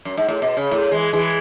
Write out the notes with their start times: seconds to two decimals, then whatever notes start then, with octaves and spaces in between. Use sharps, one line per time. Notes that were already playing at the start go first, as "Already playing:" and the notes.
0.05 F#2
0.17 G#2
0.28 A2
0.42 B2
0.57 C#3
0.71 A2
0.91 E3 G#3
1.13 E3 G#3